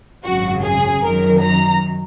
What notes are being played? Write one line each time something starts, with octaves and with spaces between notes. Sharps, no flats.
G#1 F#2 C#3 F#3 F#4
G#4
F#2 D#3 F#3 A#4
A#5